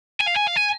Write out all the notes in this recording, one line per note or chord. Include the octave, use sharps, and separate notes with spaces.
G#5
F5
G#5
F5
G#5